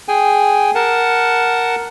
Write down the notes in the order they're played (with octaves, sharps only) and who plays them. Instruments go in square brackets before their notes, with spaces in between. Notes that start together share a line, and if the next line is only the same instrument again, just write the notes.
[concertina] G#4 G5 G#5
A#4 F#5 A5